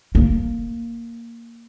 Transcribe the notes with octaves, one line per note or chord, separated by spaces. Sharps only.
A#3